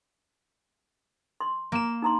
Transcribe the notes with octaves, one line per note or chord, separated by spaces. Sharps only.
C6
A#3 E7
D#4 A#5 C6